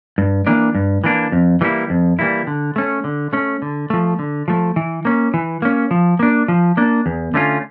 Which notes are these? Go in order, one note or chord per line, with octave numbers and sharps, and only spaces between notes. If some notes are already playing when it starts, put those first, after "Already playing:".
G2
E3 A#3 D4
G2
E3 A#3 D4
F2
E3 G3 A#3 E4
F2
E3 G3 A#3 E4
D3
A3 C#4
D3
A3 C#4
D3
F3 A3
D3
F3 A3
E3
A#3 C#4
E3
A#3 C#4
F3
A#3 D4
F3
A#3 D4
E2
D3 A3 C#4 F4